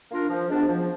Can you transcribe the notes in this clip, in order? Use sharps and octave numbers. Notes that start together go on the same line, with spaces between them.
A#3 D4 F4 A#4
F3
G#3 B3 D4 F#4
F3